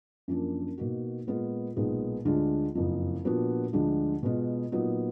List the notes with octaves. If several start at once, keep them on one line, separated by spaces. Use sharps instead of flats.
F#2 F3 A#3 D4
B2 A#3 D#4 F#4
A#2 G#3 B3 F4
B1 A#2 G#3 B3
D2 D3 G#3 D4 F4
F#1 F2 F3
A#2 F3 B3 D4 F#4
D2 D3 F3 G#3 D4
B2 G#3 B3 F4
A#2 F#3 B3 D#4